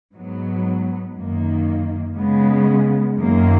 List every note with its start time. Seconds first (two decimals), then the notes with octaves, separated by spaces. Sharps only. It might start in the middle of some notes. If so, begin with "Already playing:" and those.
0.14 G#2 F#3 B3
1.15 F#2 D#3 A#3
2.16 C#3 G#3 B3
3.17 F#2 D#3 F#3 A#3